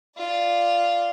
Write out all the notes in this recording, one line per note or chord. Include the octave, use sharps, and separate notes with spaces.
F4 D5